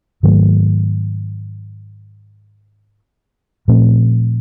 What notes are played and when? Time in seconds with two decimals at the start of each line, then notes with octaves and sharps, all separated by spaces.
0.23 G#2 D#3 F#3 A3
3.68 A#2 F3 A3 C4